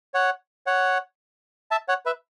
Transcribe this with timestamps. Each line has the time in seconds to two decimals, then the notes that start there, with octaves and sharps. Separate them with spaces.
0.14 C#5 F#5
0.67 C#5 F#5
1.71 E5 A5
1.89 C#5 F#5
2.06 B4 E5